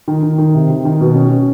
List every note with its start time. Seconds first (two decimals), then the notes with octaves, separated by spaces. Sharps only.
0.08 D#3
0.23 D#3
0.38 D#3
0.54 C3
0.70 D#3
0.85 D#3
1.01 B2
1.16 C#4
1.31 C#4